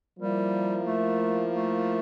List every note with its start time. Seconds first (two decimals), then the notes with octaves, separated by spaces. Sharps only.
0.19 F3 G3 A#3 E4 A#4
0.86 A3
1.54 A3